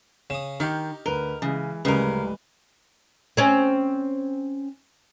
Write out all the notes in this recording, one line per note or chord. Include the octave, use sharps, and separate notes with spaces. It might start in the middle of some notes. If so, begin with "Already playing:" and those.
C#3 D#6 E7
D#3 D#4 G4 F6 G6
D2 A#4 B4 G7
C#3 E3 G#3
D1 C#3 G3 G#3 A#4 B4
C4 C#4